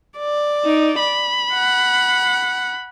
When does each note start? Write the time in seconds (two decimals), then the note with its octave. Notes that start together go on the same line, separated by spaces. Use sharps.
0.18 D5
0.65 D#4
0.99 B5
1.54 F#5